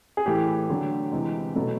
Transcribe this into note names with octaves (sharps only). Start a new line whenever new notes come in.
G#4
A2 E3 A3 G4
D3 F#3 A3
C3 E3 G#3
B2 F#3 A3